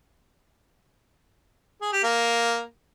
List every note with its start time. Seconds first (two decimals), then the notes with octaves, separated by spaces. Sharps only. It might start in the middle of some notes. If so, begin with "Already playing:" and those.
1.82 G#4
1.93 G4
2.03 A#3